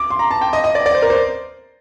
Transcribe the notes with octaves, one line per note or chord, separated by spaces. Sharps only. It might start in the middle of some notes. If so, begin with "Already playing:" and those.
Already playing: D6
C6
A#5
A5
G5
D#5
D#5
D5
D5
C5
A#4
C5